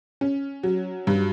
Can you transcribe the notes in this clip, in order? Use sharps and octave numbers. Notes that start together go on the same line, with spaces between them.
C#4
F#3
G2